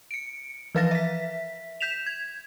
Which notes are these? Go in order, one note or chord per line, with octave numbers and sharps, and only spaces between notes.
C#7 D7
E3 F3 B4 F5 A6 A#6
E5 B6
G6 B6 E7 F7
G#6